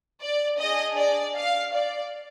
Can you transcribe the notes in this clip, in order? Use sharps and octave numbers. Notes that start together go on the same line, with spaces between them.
D5
D4 G#4 D#5
D5
F5
D5